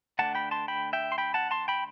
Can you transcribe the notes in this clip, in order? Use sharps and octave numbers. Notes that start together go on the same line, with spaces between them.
D3 A3 D4 F#5 A5
G5 B5
A5 C6
G5 B5
E5 G5
C6
G5 B5
F#5 A5
A5 C6
G5 B5